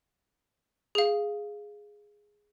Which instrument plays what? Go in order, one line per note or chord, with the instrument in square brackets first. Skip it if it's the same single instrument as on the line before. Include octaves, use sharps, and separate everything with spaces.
[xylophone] G#4 F5